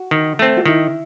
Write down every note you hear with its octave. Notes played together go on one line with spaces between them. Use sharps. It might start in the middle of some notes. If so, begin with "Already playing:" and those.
Already playing: F#4
D#3
A3 C4
F#4
D#3 E4